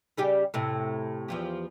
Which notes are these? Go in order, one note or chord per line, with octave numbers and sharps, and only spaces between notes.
C#3 G3 G4
A2 C3
E2 F3 G4